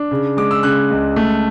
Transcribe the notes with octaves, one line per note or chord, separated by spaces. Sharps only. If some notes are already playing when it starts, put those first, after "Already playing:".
Already playing: D4
C#3
G#3 D6
E6
C#3 F#6
C#2
A3